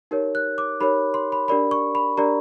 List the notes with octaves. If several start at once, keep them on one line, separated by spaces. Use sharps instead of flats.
D#4 G4 A#4 C#5
F#6
D6
D#4 G4 A#4 C#5 B5
C6
B5
D4 G4 A#4 D5 B5
C#6
B5
D4 G4 A#4 D5 A#5